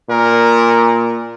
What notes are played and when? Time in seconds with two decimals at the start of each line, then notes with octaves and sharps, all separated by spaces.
0.10 A#2 A#4